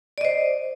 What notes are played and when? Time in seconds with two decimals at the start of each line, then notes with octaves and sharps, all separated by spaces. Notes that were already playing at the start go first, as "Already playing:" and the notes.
0.18 D5
0.21 D#5
0.25 C5